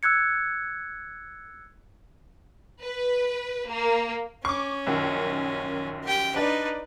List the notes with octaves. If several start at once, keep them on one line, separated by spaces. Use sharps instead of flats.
E6 F#6 G#6 C#7
B4
A#3
C#4 C#6 D6
A#1 F#2 D#3
G4 G5
D4 D#4 B4 D5